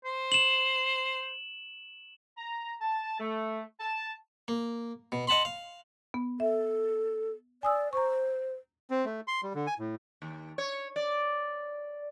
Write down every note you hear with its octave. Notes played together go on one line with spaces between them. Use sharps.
C5
E7 F#7
A#5
A5
A3
A5
A#3
B2
D#5 F#5 A5 B5 C6
F5
B3
A4 E5
D5 G#5 D#6 E6
C5 A#5 C#6
C4
A3
C6
G3
D3
G#5
A2
D#2
C#5
D5